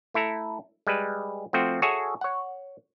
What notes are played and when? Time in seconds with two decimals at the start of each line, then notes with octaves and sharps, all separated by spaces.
0.14 A3 E4 A4 A#5
0.87 G3 G#3 B4
1.53 F3 A3 C4 F#4
1.82 F#4 G#4 A4 C#5 E5 G#5
2.21 C#5 F#5